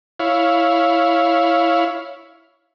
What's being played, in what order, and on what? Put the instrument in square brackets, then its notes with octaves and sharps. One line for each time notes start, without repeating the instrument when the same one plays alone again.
[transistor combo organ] E4 C#5 F5